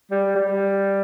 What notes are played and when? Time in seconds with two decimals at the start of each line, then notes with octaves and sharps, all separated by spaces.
0.11 G3
0.35 G3